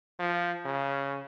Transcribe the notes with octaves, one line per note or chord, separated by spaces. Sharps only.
F3
C#3